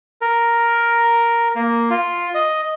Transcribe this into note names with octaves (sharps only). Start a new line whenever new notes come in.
A#4
A#3
F4
D#5